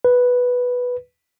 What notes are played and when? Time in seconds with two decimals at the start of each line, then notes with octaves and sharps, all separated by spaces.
0.05 B4